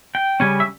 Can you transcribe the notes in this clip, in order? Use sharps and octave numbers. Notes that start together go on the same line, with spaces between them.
G5
C#3 G3 C#4 G#5
E5